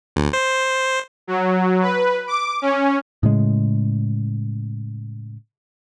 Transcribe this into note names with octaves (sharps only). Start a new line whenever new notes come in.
D2
C5
F#3
B4
D6
C#4
A2 C#3 G#3